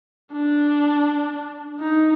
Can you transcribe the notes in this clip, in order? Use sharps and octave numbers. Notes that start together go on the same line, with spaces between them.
D4
D#4